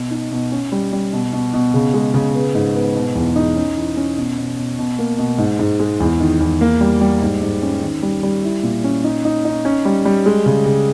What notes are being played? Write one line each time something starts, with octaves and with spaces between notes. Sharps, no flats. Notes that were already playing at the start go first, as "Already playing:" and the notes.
Already playing: B2
D#4
B2
C#4
G3
G3
B2
B2
B2
C#3
G#3
C#3
B3
G#2
B3
B2
E2
D#4
C#4
E3
C#4
B2
B2
B2
B2
A#3
B2
G#2
G#2
G#3
E2
D#3
E2
A#3
G3
G3
G#2
G#2
C#4
D#3
G3
G3
E4
A#2
C#4
D#4
D#4
D#4
C#4
G3
G3
G#3
C#3
C#3